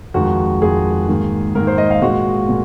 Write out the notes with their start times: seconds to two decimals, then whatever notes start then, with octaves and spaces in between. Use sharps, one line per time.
0.14 F2 D#3 G#3 F#4
0.62 F2 D#3 G#3 G#4
1.08 G#2 D#3 A#3
1.55 G#2 D#3 A#3 A#4
1.67 C5
1.78 D#5
1.91 F5
2.02 A#2 G#3 F#4
2.49 A#2